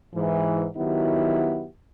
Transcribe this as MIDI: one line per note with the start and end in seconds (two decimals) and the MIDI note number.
0.14 0.65 44
0.14 0.65 52
0.76 1.66 51
0.76 1.66 54
0.76 1.66 59
0.76 1.66 64
0.76 1.66 67